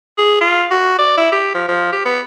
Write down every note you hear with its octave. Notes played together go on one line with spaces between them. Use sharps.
G#4
F4
F#4
D5
E4
G4
F3
F3
G4
B3